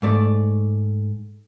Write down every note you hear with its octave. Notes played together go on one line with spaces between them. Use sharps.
G#2 A3 D5